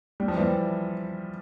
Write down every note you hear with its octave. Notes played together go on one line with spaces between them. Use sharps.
G3
F3
E3 G3